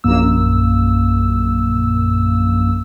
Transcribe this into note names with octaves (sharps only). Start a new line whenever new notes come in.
A#1 F#2 A#3 E6